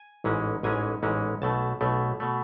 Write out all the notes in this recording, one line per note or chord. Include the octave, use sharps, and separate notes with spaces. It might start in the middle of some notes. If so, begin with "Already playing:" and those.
Already playing: G#5
A1 G#2 E3 G#3 C#4
A1 G#2 E3 G#3 C#4 G#5
A1 G#2 E3 G#3 C#4
B1 B2 A3 A5
B1 B2 A3
B2 A3